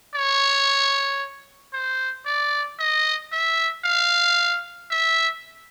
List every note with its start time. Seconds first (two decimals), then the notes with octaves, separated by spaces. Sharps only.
0.15 C#5
1.73 C5
2.26 D5
2.79 D#5
3.32 E5
3.85 F5
4.91 E5